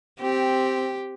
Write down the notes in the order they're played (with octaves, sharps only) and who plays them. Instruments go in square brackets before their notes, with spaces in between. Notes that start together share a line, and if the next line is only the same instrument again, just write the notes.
[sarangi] C4 [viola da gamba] G4